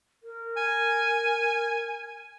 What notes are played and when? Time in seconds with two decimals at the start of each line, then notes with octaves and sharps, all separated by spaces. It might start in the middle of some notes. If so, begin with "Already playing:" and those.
0.23 A#4
0.57 G#5